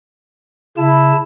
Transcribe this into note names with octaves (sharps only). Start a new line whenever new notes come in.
C#3 E4 A5